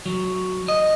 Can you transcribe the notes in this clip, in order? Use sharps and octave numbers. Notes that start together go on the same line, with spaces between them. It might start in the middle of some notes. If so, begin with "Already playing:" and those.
F#3
D#5